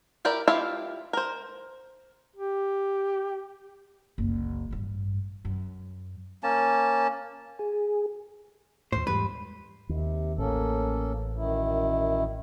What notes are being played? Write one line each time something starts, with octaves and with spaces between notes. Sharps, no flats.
E4 G4 A#4 D5
E4 F4 G4 E5 F5
A#4 C5
G4
F#1 C2
A1 G2
F#2
A#3 C#4 A5
G#4
D#2 A2 C5
E2 G#2 G3 B4
D#2 C3
A1 A#3 C#4 A4
F#2 D#3 E4